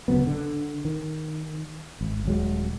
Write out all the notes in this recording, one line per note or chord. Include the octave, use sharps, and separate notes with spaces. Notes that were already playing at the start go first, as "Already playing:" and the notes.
D1 C#3 F#3 B3
D3
D#3
G#1
D#1 F#3 G#3